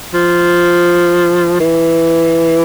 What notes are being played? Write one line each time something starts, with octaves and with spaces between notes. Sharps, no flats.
F3
E3